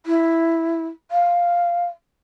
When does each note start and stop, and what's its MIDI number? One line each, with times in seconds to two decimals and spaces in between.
0.06 0.86 64
1.11 1.85 77